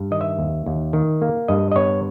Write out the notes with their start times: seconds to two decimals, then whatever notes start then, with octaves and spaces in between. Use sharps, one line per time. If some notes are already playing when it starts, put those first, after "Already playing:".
Already playing: G2
0.11 D#3 D#5
0.21 E5
0.38 D#2
0.66 D#2
0.93 D#3
1.22 A#3
1.48 G2 D#5
1.71 D#5
1.76 B3 C#5